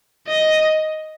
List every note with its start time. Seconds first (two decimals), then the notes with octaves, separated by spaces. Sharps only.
0.28 D#5